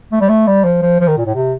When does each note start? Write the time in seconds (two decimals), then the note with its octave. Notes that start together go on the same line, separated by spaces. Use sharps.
0.12 A3
0.21 G3
0.29 A3
0.47 G3
0.64 F3
0.82 F3
1.00 F3
1.08 D#3
1.18 A#2
1.25 A2
1.35 C3